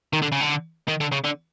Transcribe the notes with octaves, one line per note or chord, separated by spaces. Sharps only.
D#3
D3
C#3
D3
D#3
D3
C#3
D3